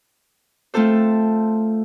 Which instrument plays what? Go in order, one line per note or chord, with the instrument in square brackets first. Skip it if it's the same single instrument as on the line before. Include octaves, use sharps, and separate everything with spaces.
[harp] A3 C4 F4 A4 C5